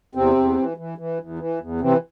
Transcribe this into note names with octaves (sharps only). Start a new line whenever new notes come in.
E2 C3 C4
E2
E3
E3
E3
E2
E3
E2
C3 E3 C4